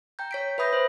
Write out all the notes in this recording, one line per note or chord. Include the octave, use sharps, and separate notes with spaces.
G5 A#5 G6
C#5 B6 D7
B4 E5 B5 D#6 G6 A#6
B4 C5